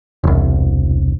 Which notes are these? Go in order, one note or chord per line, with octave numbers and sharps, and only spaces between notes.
E1 C2